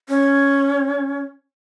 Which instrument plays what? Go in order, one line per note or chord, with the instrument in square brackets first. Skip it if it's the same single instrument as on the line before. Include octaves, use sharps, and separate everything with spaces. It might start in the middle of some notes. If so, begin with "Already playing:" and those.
[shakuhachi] C#4